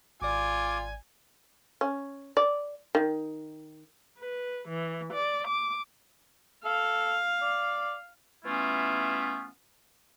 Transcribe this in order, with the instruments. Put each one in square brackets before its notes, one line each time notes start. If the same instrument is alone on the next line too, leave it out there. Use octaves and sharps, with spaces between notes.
[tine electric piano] G#1 D5 [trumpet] F4 [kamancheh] G#5 [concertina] D6
[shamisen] C#4
D5
D#3
[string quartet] B4
E3
D5
D6
[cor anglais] A4 [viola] F5
[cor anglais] D5
[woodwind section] E3 A3 B3 C#4 E4 F4